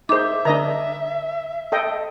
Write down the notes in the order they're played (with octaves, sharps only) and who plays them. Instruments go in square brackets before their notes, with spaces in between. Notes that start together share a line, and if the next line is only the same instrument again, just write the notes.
[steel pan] D#4 C5 [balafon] G#4 D6 [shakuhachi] E5
[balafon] D3 [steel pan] D4 D#5 A#5
[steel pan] A4 D#5 G5